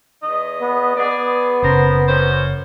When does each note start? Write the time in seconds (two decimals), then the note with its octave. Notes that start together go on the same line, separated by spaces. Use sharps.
0.23 E2 D#5
0.61 B3
0.97 B3 G#4 D5
1.62 F#1 C#3 A#4 C5
2.07 F#2 C#4 C5